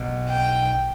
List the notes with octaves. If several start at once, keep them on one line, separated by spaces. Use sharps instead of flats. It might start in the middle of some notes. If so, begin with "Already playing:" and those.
Already playing: B1 B2
G5